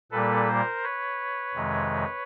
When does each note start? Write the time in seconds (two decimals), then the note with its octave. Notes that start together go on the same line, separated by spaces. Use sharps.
0.11 A#2 G3 A#3 A4 B4
0.48 A#4 C5
0.83 B4 C#5
1.55 F2 C3 D#3 G#3